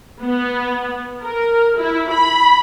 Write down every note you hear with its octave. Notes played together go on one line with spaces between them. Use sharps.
B3
A#4
E4
B5